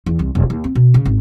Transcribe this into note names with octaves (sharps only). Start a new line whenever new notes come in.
E2
C2
E1
D#2
C4
B2
C#3
G#1